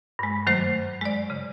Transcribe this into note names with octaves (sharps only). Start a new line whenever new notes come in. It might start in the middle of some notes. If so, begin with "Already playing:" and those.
G2 G#3
F#2 D#3 F#3 A3 C5
G#3 D5
C#3